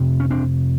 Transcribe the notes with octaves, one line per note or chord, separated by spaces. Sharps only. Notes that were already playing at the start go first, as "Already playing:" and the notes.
Already playing: F2 C3
C#4
C4 D4